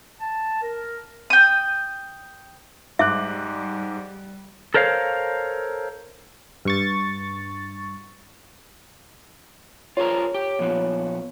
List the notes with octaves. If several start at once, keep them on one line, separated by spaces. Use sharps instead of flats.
A5
A#4
G5 D#6
G#2 G3 E5 D6 F#6
A4 A#4 C5 C#5 F5
G2 C#6 A6
F4 G#4 A#4 C#5
G4
A#2 F3 B3